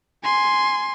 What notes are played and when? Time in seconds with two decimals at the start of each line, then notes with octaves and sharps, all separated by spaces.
0.23 G#5 C6